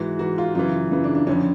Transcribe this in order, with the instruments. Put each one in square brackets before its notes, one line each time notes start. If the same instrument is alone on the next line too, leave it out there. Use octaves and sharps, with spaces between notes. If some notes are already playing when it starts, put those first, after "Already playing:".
Already playing: [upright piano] G#2 E3 F#4
G#2 E3 F#4
F4
F#2 C#3 E3 F4
F#2 C#3 E3
D4
D4
F2 D3 F3 C#4